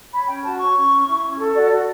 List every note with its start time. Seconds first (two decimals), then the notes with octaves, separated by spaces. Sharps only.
0.11 C#5 B5
0.27 C#4 G5
0.43 F#4 A5
0.59 C#5 C#6
0.75 C#4
0.91 C#4
1.07 E4
1.23 C#4
1.38 A4
1.54 F#4 D5
1.71 F#4 D5